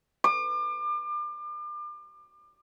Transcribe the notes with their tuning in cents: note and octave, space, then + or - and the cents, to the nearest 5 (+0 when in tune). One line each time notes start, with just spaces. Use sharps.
D6 +35